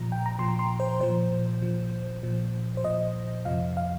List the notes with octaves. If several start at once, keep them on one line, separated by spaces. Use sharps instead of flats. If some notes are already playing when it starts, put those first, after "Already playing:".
Already playing: A#2 F3 A#5
G5
A#5
A#2 F3 C6
C6
C5
A#2 F3 C5
A#2 F3
A#2 F3
C5
A#2 F3 D#5
F2 C3 F3 F5
F5